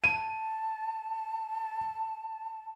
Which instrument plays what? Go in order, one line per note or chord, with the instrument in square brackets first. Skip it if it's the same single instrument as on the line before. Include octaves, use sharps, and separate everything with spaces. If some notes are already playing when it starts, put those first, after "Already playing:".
[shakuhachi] A5 [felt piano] D#7